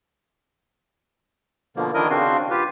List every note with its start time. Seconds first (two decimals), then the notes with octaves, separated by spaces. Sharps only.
1.76 B2 D3 F3 A#3
1.94 D#3 F3 D4 E4 A#4 D#5
2.10 C#3 C4 D4 F#4 C6
2.51 F4 G4 B4